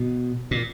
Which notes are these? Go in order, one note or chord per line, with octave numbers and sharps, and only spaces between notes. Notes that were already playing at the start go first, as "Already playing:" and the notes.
Already playing: B2
A#2